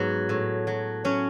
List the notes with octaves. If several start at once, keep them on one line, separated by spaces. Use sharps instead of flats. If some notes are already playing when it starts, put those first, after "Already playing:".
Already playing: G#2 F#3 B3
A2
F#3
F#3 C#4